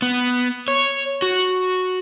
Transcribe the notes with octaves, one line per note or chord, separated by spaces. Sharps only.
B3
C#5
F#4